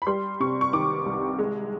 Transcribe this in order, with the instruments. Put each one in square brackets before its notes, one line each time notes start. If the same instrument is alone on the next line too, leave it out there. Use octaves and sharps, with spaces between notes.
[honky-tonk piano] B5
G3 C6
C3 C#6
C#6
D#3 D6
C2
G#3